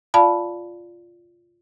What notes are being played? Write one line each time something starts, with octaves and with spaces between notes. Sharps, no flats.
F4 D5 F5 A5 B5